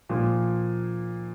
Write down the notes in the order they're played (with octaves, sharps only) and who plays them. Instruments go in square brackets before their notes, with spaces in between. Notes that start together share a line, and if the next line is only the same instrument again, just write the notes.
[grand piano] A#2 F3 A#3 F4